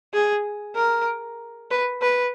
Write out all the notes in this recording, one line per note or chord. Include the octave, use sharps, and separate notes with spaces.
G#4
A#4
B4
B4